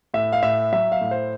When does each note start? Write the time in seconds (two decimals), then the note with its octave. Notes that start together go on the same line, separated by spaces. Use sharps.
0.14 A2 E5
0.32 F5
0.43 A2 E5
0.72 F#3 E5
0.92 F5
1.01 A2
1.11 C5